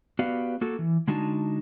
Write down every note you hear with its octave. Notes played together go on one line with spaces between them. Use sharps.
B3 F#4 G4 B4 D5 F5
A#3 F#4 A4
E3
D3 G#3 D4 D#4 F#4 A5